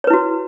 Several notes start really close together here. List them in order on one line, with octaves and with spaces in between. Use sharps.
C#5 B4 E4 F#4